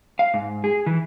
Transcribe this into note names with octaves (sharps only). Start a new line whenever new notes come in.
F5
G#2
G#4
E3